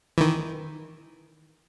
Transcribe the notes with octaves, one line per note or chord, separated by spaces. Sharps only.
D#3 E3